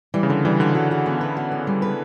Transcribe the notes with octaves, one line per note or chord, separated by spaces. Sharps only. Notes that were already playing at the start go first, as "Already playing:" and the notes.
E3 G3
C#3
D3 G3
E3 G3
D3 F#4
D3 F#4
F#4
B3
B4
F#4
B3
G3
B4